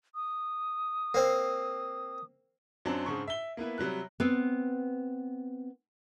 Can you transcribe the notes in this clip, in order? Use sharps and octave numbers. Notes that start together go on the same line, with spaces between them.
D#6
A#3 C4
F#2 F#3 C4 D4
G#2 C#3 C4 D4 C#6
E5 G7
A#3 B3 E4 B4
C3 F#3 G3 F#6
B3 C4